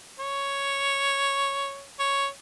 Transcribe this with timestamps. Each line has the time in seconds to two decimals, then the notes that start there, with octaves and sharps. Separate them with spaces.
0.19 C#5
1.99 C#5